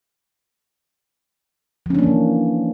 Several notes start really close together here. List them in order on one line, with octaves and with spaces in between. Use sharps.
F3 C#4 D4 A#3 E3